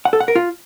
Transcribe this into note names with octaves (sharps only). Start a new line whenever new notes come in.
F#5
A4
F#5
A#4
F4